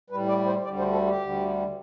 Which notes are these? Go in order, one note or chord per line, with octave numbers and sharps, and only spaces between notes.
A2 G3 B4
D5
C5
D2 D3 G3 D5
C5
A4
G4
D2 D3 G3